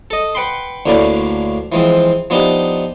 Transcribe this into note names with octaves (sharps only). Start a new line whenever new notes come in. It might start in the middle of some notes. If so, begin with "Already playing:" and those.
A4 D#5
B4 F#5 G5 B5 C6
D2 A2 D3 A#3 B4 D5
E3 F3 G#3 C4
F3 B3 D4 D#4 G4